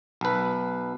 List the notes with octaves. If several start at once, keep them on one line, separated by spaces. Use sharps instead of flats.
B1 B4